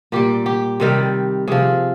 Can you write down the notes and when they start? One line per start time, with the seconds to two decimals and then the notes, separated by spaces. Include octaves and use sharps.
0.12 A#2 G3 G4
0.46 G4
0.80 C3 D#3 G3
1.48 C3 F3 G#4